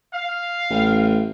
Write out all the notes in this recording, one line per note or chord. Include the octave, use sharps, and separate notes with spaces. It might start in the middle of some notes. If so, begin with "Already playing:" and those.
F5
A1